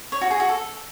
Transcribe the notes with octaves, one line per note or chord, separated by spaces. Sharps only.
C#5
F#4
G#4
F#4
A4